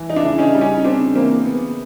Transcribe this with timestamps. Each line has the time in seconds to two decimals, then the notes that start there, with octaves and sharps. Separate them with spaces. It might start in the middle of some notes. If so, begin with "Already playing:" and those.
Already playing: E3
0.10 D#4
0.16 D4 E4
0.24 C#3
0.38 C#4 D#4
0.55 G3
0.61 C#4 D#4
0.85 C#3 C4 D4
1.15 E3 A#3 C4
1.46 C#3 B3